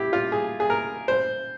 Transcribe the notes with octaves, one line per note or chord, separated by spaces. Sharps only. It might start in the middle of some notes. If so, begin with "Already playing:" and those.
Already playing: E4 G4
F4
G#4
G#4
A#4
C5